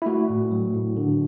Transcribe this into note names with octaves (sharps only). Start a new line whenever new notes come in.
E4
A3 F#4
A2
F#3
A2
D3